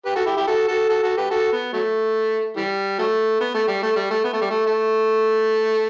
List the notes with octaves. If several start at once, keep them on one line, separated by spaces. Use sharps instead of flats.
G4 B4
F#4 A4
E4 G4
E4 G4
F#4 A4
F#4 A4
F#4 A4
F#4 A4
G4 B4
F#4 A4
B3
F#3 A3
E3 G3
F#3 A3
B3
A3
G3
A3
G3
A3
B3
A3
G3
A3
A3